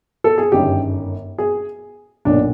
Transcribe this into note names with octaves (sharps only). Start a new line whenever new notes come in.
A4
G#4
G1 F#2 D#3 G4
G#4
B1 A#2 D4